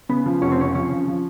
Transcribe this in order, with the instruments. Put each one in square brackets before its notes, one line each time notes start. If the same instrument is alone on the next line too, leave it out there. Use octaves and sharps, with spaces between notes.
[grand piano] C#3 [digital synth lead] B3
[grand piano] F3
[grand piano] F1 [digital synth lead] C#4
[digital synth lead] C4
[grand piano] C#3 [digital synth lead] C#4
[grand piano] F3 [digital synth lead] C#4
[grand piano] F3
F3